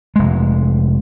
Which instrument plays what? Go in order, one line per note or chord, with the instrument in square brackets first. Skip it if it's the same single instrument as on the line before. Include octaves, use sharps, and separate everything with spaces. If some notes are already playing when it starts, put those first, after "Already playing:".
[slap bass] F1 G#3